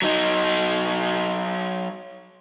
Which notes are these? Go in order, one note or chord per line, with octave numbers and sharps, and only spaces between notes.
F#3 D#4